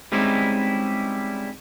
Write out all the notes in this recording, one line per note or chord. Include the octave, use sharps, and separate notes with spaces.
G3 G#3 C4 C#4 D#4 E4